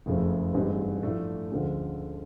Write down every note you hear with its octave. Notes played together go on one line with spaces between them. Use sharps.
F#1 F2 C#3 F3 A3
A1 G2 D#3 G#3 C4
A2 F3 A3 D4
D2 D3 F3 G#3 C#4